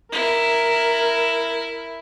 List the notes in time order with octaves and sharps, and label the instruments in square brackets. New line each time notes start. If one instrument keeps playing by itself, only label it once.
[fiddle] E4 [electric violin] A#4